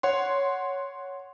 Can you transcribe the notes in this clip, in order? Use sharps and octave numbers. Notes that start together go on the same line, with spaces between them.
C#5 F#5 C6